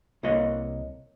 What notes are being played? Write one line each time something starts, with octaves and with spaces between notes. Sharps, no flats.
C2 A#3 C#5 D#5